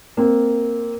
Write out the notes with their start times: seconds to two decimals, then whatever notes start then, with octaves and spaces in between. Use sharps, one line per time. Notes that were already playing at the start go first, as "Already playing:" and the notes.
0.17 A#3 C4